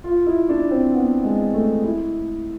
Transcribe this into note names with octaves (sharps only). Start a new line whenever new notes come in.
F4
E4
D4
C4
B3
G#3
A3
E4